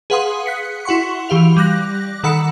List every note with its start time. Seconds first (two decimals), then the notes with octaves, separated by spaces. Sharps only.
0.10 G#4 B4 F5 F#5 C6 D#6
0.46 F#6 B6 C#7
0.85 E4 F#4 F#5 C6 C#6
1.29 E3 G4 F5 F7
1.57 G3 D6 F#6 A#6
2.23 D#3 A4 F#5 B5 E6 C#7